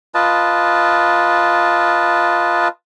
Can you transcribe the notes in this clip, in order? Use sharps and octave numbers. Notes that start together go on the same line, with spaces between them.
F4 B4 D#5 A5